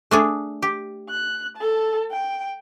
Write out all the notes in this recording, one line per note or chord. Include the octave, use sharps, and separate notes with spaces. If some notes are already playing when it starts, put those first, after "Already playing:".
A3 D4 G#4
G4
F#6
A4 A5
G5